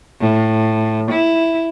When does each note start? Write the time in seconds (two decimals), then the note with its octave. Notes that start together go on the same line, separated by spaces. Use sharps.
0.20 A2
1.11 E4